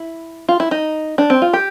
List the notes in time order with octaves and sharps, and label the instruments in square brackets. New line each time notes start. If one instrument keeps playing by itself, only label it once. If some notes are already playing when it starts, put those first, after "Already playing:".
Already playing: [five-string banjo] E4
F4
E4
D#4
D4
C4
F4
G4